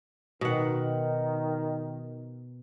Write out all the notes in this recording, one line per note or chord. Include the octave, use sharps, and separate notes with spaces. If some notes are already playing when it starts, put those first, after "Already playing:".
B2 D#3 F#5